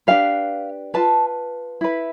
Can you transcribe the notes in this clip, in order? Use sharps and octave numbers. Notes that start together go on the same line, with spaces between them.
D4 G4 B4 F5
F4 B4 A5
E4 B4